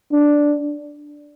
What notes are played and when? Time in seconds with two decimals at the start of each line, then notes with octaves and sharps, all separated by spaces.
0.12 D4